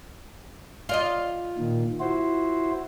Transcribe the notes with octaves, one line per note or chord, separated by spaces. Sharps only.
F4 D5 D#5
A#2 D#3
E4 F#4 C5